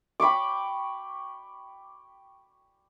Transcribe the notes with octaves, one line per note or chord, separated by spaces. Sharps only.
G5 B5 C#6 D6